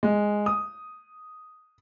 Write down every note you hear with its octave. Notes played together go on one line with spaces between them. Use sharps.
G#3
D#6